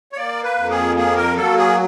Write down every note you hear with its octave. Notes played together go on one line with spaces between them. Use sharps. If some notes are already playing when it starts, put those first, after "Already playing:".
C#5
A#3 D5
B4
F2
G#4
A#3 G#4
A#4
F#3 A4
G#4